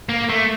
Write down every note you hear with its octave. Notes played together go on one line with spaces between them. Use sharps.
A#3
A3